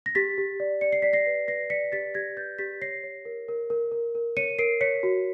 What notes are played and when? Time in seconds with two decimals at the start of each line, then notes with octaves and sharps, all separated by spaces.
0.06 A#6
0.15 G4 A6 B6
0.38 G4
0.60 D5
0.81 D5 C#7
0.93 C7
1.02 D5 B6
1.13 A#6 C7
1.26 B4
1.48 B4 A#6 C7
1.70 D5 B6 C#7
1.92 G4 A6 B6
2.14 G4 G#6 A#6
2.36 B4 G6 A6
2.58 G4 A6 B6
2.81 C#5 A#6 C7
3.03 C#5
3.25 A#4
3.48 A#4
3.70 A#4
3.92 A#4
4.15 A#4
4.37 C#5 C#7 D#7
4.59 A#4 C7 D7
4.81 C#5 B6 C#7
5.03 F#4